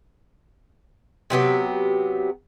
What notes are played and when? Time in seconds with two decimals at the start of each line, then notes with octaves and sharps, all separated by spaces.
1.30 C3 F#3 B3 G4